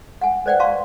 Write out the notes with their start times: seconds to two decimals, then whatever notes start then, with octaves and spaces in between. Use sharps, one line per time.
0.21 F#5 G#5
0.46 B4 C5 D5 F#5 G5
0.60 F5 A5 C6 C#6